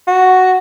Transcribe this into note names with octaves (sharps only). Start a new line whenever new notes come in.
F#4